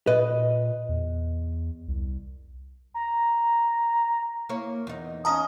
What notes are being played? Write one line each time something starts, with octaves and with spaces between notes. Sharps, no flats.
A#2 B4 D#5
E2
C2
A#5
A#3 E4 C#5
E2 D#4
C#4 D#5 F5 A5 A#5 D#6